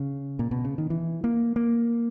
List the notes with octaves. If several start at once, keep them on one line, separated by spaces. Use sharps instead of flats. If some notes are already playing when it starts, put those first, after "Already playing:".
Already playing: C#3
A#2
B2
C#3
D#3
E3
A#3
A#3